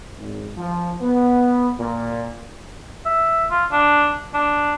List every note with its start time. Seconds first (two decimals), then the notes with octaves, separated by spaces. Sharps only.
0.18 G#1
0.57 F3
1.01 B3
1.79 A#2
3.06 E5
3.51 F4
3.72 D4
4.34 D4